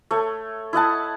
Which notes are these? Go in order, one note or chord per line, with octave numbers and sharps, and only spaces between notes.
A3 C#5
E4 D#5 F#5 A5